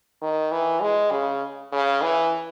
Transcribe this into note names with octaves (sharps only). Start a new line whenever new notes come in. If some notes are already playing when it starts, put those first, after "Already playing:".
D#3
E3
G#3
C#3
C#3
E3